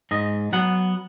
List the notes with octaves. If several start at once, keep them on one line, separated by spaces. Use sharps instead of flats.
G#2 D#5
F#3 B3 F#5